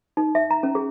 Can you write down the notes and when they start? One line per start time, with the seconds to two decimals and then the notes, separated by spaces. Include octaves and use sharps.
0.17 D#4
0.35 E5
0.51 A#5
0.63 C#4
0.75 G#4